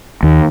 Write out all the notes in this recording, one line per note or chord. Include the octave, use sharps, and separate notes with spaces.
D#2